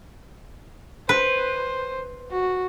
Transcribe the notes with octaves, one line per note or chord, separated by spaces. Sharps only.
B4 C5
F#4